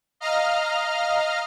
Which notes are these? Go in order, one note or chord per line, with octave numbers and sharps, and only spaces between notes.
D#5 F5 A#5 F6